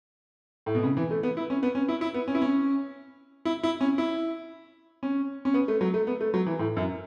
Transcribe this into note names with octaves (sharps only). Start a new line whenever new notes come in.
A2
B2
C#3
E3
A3
B3
E4
C#4
B3
C#4
E4
E4
B3
C#4
E4
C#4
E4
E4
C#4
E4
C#4
C#4
B3
A3
F#3
A3
B3
A3
F#3
E3
A2
F#2